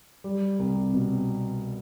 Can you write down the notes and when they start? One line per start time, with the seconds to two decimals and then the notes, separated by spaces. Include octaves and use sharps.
0.24 G3
0.59 C2
0.93 B2